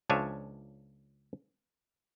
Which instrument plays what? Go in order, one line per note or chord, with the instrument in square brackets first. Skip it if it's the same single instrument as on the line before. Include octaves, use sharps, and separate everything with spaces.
[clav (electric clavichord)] C#2 F3 D4 C#5 E5 G#5